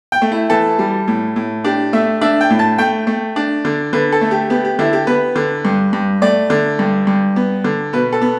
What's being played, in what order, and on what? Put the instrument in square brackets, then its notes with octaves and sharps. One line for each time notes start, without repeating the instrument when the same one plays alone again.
[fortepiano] G5
A3
E4
E3 A4
G3
A2
A2
D4 G4
A3 E5
D4 E5
G5
A2
A5
A3 G5
A3
D4
D3
D3 B4
A4
A3
G4
B3 G4
G4
D3 E4
G4
B3 B4
D3
G2
G2
A3 D5
D3
G2
G2
B3
D3
B2 B4
A4
B3